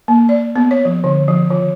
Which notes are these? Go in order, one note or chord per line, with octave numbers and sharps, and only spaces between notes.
A#3
D5
B3
C#5
F3
D3
F3
D#3